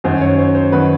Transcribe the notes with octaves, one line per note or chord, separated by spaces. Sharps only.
F#2 D#3 F#3 C5
C#5
C5
C5
D#3 F#3 B4